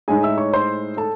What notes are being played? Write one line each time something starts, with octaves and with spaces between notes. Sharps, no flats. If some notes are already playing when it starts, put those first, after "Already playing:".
A2 G#3 D#4 G#4 G#5
E5 E6
C#5 C#6
C5 C6
A4 A5